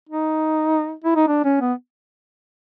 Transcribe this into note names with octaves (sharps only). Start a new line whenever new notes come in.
D#4
E4
D#4
D4
C#4
B3